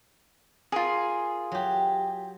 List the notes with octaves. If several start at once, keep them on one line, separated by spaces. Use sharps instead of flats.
F4 G#4 A#4
F#3 G4